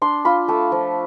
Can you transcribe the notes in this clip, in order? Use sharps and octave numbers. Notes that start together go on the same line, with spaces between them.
D4 C6
F4 B5
A3 A5
F3